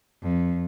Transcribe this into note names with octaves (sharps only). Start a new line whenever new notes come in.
F2